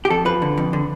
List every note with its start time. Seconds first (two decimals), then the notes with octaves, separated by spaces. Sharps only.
0.05 G4
0.10 F2 A4
0.25 F3 B4
0.42 D3
0.57 F2
0.73 D3